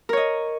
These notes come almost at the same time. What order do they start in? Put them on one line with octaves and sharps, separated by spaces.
A#4 C#5 D#5